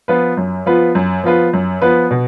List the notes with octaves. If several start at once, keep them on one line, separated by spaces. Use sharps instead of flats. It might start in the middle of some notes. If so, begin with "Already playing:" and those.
F3 B3 F4 B4
F#2
F3 B3 F4 B4
F#2
F3 B3 F4 B4
F#2
F3 B3 F4 B4
B2